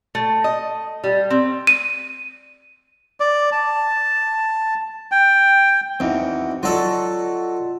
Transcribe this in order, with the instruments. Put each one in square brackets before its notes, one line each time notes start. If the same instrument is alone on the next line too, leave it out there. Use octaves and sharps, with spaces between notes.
[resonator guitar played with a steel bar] A3
D#5
G3
C4
[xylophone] D#7
[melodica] D5
A5
G5
[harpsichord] E2 [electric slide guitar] C4 D#4 F#4
[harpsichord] F#3 A4 [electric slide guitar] F4 D5 D#5